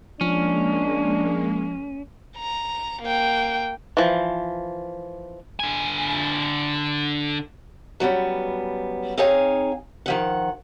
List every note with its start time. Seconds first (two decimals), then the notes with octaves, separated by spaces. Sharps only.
0.21 F3 G#3 A#3 C#4 D4
2.37 A#5
3.02 A#3 G5
3.97 E3 F3
5.60 D3 G#5
8.00 F#3 G3 B3 C#4
9.18 C4 D#4 G#4 C#5 F5 G#5
10.06 D#3 F3 F#5